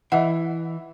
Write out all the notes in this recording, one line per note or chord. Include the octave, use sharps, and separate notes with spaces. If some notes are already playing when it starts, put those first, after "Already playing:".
E3 D#5 E5 F#5